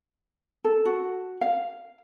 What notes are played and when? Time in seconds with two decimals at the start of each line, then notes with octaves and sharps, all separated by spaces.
0.64 A4
0.85 F#4
1.41 F5